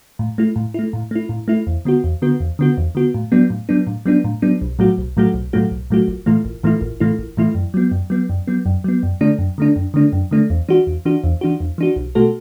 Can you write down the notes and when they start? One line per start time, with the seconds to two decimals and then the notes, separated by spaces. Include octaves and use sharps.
0.19 A2
0.38 A3 E4
0.56 A2
0.74 A3 E4
0.93 A2
1.11 A3 E4
1.29 A2
1.48 A3 E4
1.67 E2
1.85 D3 B3 F#4
2.04 E2
2.22 D3 B3 F#4
2.40 E2
2.59 D3 B3 F#4
2.78 E2
2.95 D3 B3 F#4
3.14 A2
3.32 F#3 B3 D4
3.50 A2
3.69 F#3 B3 D4
3.87 A2
4.06 F#3 B3 D4
4.24 A2
4.42 F#3 B3 D4
4.62 B1
4.79 A2 F#3 A3 F#4
4.98 B1
5.17 A2 F#3 A3 F#4
5.34 B1
5.53 A2 F#3 A3 F#4
5.71 B1
5.90 A2 F#3 A3 F#4
6.08 A1
6.26 A2 E3 A3 E4
6.45 A1
6.64 A2 E3 A3 E4
6.81 A1
7.00 A2 E3 A3 E4
7.19 A1
7.37 A2 E3 A3 E4
7.55 F#2
7.74 F#3 B3
7.91 F#2
8.10 F#3 B3
8.29 F#2
8.47 F#3 B3
8.66 F#2
8.84 F#3 B3
9.03 F#2
9.21 D3 A3 D4
9.39 F#2
9.58 D3 A3 D4
9.76 F#2
9.94 D3 A3 D4
10.13 F#2
10.31 D3 A3 D4
10.50 E2
10.69 E3 D4 F#4
10.87 E2
11.05 E3 D4 F#4
11.24 E2
11.41 E3 D4 F#4
11.60 E2
11.78 E3 D4 F#4
11.96 B1
12.15 B2 A3 F#4 A4